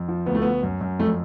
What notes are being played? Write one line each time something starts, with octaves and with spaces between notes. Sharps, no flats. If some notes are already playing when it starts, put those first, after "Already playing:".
Already playing: F2
F3
D2 B3
A3
D2 B3
F#2
F#2
F2 A3